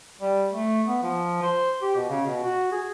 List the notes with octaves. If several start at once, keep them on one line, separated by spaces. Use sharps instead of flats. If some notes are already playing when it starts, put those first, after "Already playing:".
G3
A3
B3
F3
C5
G4
B2
C#3
B2
F#4
G#4